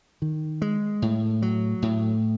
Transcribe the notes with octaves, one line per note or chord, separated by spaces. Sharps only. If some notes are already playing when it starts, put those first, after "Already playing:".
D#3
G#3
A2
F#3
A2